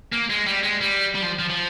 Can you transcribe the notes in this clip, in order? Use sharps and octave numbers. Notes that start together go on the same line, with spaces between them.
A#3
G#3
G3
G#3
G3
G3
F3
F3
F3